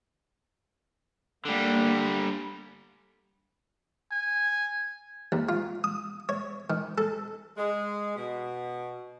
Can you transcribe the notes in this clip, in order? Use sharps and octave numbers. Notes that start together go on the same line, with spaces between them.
D3 G3 A#3
G#5
D#2
F4
D#6
C#5
D#3
A4
G#3
B2